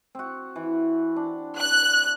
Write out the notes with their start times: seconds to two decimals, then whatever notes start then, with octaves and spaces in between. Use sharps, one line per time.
0.15 C4 F#4
0.56 E3
1.16 D4
1.58 F#6